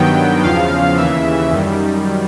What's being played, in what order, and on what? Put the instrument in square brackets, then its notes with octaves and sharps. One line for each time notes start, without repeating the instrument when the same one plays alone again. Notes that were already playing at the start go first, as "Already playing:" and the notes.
Already playing: [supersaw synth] G2 D#3 F#3 B3 G5
E2 C#3 F3 F5
D#2 C#3 E3 E5
F#2 D#3 G3